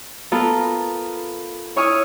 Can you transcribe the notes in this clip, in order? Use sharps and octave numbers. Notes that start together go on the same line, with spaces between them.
B3 F4 A4 A#4
E4 C#5 G#5 C#6 D#6 F6